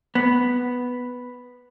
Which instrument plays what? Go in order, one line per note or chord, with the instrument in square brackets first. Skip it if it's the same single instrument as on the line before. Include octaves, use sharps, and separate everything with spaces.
[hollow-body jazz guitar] B3